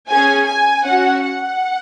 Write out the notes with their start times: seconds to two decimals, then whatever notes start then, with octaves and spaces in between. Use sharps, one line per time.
0.10 C#4 G#4 G#5
0.48 G#5
0.86 C#4 F#4 F#5
1.24 F#5